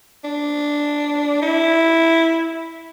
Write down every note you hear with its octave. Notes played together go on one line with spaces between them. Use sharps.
D4
E4